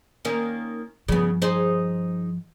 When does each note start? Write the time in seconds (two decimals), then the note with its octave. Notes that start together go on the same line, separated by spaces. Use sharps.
0.25 D#3 A#3 C#4
1.08 G2 C#3 F3 B3
1.42 D#4 G#4 C5